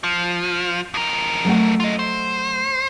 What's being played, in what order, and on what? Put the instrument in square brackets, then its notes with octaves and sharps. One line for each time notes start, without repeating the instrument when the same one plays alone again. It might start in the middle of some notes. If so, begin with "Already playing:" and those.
[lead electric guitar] F3
F2 A#4
[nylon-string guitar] F#3 A3 F#5
[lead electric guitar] F4 D#5
C5